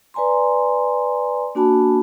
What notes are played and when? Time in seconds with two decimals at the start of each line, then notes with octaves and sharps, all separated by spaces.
0.14 B4 D5 G#5 A#5 C6
1.55 A#3 D4 F#4 G#5 A5 B5